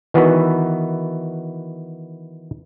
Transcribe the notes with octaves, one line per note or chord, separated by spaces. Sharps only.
D#3 E3 B3 F#4